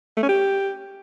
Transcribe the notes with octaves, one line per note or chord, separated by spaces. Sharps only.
A3
C#4
G4